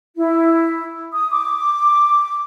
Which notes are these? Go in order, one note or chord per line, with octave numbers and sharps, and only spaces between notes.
E4
D#6
D6